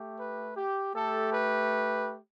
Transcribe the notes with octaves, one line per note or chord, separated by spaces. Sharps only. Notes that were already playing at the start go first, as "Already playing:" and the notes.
Already playing: A3 G4
B4
G4
A3 G4 A4
B4